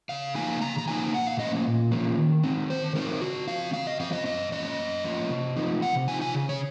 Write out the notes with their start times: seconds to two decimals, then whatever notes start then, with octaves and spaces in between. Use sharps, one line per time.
0.09 C#3 F5
0.35 F3 A#3 D#4 G#5
0.61 C#3 A#5
0.78 A#5
0.88 F3 A#3 D#4 G#5
1.13 A#2 F#5
1.27 F5
1.39 F3 A#3 C#4 D#5
1.66 A#2
1.92 F3 A#3 C#4
2.18 D#3
2.43 F#3 C4 D#4
2.70 D#3 C5
2.95 F#3 C4 D#4 A#4
3.21 C#3 F#4
3.47 F3 C4 F5
3.74 C#3 F5
3.87 D#5
4.00 F3 C4 F5
4.13 D#5
4.25 F#2 D#5
4.52 F3 A#3 C#4 D#5
4.78 F#2
5.04 F3 A#3 C#4
5.30 C3
5.56 F3 C4 D#4
5.82 C3 F#5
6.08 F3 C4 D#4 G#5
6.22 G#5
6.34 C#3
6.49 C#5